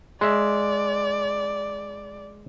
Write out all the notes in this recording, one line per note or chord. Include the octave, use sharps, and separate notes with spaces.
G#3 D5 E5